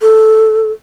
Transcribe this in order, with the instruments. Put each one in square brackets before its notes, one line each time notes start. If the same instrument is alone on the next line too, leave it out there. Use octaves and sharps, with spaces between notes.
[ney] A4